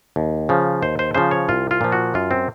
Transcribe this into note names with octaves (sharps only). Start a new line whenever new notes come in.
D#2
C#3 F3
D#2 C5
C5
C#3 F3 C5
C#5
C2 F4
F4
A#2 F3
F#4
F#2 F4
C4